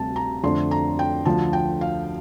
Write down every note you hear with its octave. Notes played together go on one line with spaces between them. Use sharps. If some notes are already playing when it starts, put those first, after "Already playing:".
Already playing: D2 C3 G3 A5
A#5
F2 D3 A3 D4 C6
A#5
G5
D2 D3 F3 A5
G5
F5